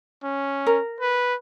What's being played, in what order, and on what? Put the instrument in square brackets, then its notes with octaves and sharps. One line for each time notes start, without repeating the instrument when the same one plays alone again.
[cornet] C#4
[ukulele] A#4
[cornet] B4